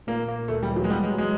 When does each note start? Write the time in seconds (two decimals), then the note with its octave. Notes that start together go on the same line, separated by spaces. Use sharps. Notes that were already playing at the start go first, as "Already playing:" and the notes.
0.07 A#2 A#3
0.28 A#3
0.48 D2 A3
0.63 G3
0.69 E3
0.76 F#3
0.84 G#3
0.90 G3 B3
1.04 G#3
1.11 F#3
1.18 G#3